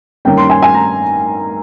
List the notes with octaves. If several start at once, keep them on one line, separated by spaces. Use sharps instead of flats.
G2 D#3 A#3 C#4 G5
C6
G#5
G#5
A#5